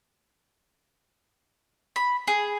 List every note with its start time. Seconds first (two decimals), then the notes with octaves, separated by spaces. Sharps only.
1.96 B5
2.27 G#4